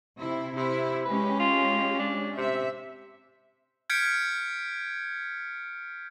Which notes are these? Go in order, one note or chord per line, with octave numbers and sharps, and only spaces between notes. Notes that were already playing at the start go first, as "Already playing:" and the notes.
C3 E4
C3 E4
G#3 C#4 G4 B4
F4
D4
C3 E5
F6 G6 G#6 B6 C#7 D7